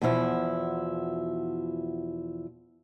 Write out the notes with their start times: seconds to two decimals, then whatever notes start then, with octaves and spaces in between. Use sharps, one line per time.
0.02 E2 B2 F3 E4